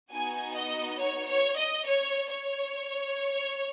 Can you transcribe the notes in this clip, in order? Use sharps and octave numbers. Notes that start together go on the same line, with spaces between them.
B3 D#4 F#4 G#5
D#5
C#5
C#5
D#5
C#5
C#5